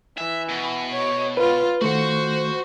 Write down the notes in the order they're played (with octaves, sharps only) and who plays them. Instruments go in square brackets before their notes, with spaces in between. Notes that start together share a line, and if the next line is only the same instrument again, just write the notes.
[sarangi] E3 [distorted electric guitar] E5
[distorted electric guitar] B2
[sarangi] C#5
[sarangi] F4 [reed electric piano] B4
[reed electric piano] D#3 A3 [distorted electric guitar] F#4 F#5 [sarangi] C5